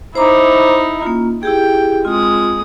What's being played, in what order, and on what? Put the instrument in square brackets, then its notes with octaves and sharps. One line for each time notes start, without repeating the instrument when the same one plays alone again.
[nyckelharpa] D#4 E4 [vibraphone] C5 A#5 D6
[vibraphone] A#3 C#4 F4
[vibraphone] E4 G4 G#4 [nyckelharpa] G5
[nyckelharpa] G#3 D#6 [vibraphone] C4 F4